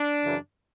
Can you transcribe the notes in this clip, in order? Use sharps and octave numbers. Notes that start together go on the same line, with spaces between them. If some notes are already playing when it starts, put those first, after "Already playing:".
Already playing: D4
F#2 C#3 E3